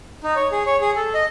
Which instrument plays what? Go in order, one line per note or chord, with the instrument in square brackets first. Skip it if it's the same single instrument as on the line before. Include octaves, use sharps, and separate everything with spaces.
[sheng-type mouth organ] D#4
C#5
G#4
C#5
G#4
A4
D#5